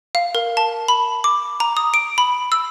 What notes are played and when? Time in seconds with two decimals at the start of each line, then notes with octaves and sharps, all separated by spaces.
0.15 F5
0.35 A#4
0.57 A5
0.88 B5
1.24 D6
1.60 A#5
1.77 D#6
1.94 D7
2.18 B5
2.52 E6